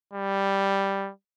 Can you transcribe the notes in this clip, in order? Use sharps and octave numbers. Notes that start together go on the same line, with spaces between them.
G3